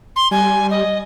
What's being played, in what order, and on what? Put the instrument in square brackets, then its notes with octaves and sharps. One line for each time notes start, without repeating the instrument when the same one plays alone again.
[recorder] C6
[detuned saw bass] G3 [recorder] G#5
[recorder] D#5